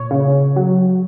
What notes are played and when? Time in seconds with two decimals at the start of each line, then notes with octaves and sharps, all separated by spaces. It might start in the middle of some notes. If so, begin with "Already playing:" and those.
Already playing: A#2 C#5
0.11 C#3
0.56 F#3